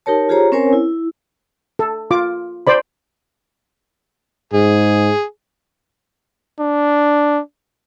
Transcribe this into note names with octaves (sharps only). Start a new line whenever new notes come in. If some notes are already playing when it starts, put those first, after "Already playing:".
D#4 G4 A#4 C#5 A5
F4 G4 G#4 C5 C#5 A#5
C4 C#4 A#4 C5 C#5 G#5
E4
A4
F4 D6
C5 D5 B5
G#2 G#4
D4